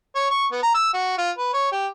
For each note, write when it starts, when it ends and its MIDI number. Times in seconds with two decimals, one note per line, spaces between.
0.15 0.26 73
0.30 0.46 85
0.52 0.63 59
0.63 0.72 82
0.75 0.92 88
0.93 1.17 66
1.18 1.31 65
1.38 1.48 71
1.53 1.70 73
1.72 1.87 67